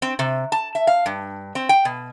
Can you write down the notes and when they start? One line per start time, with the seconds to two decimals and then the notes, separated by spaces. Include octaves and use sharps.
0.02 C4
0.19 C3
0.52 A5
0.75 E5
0.87 F5
1.06 G2
1.55 C4
1.69 G5
1.85 B2